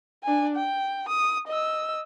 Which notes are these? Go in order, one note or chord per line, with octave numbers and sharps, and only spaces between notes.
D4 G#5
G5
D#6
D#5 E6